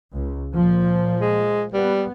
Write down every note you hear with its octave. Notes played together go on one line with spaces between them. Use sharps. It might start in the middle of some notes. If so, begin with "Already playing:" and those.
C#2
A#2 F3
G#3
G3 B3